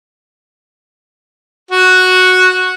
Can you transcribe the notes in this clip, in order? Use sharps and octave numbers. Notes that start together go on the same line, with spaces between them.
F#4